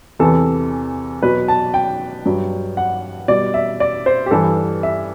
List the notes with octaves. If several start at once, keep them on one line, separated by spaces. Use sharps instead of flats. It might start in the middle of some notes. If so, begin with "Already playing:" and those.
E2 C3 E3 A4
B2 F#3 B4
A5
G5
G2 F#3
F#5
B2 G3 D5
E5
D5
C5
G4
G2 E3 G3 A4
E5